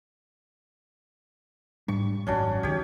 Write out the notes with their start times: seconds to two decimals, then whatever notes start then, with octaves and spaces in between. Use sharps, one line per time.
1.88 G#2 G3 D4 C#6
2.27 G#1 F#2 C#4 D4 F#4
2.63 C#2 D#3 G4 C#5